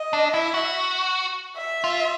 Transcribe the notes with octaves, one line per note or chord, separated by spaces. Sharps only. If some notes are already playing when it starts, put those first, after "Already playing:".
Already playing: D#5
D4
E4 E5
F#4
E5
F4